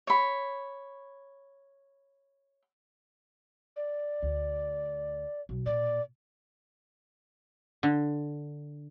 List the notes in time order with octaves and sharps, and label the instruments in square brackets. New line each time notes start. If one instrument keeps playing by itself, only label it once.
[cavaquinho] C#5 B5
[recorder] D5
[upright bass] D2
B1
[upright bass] A#2 [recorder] D5
[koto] D3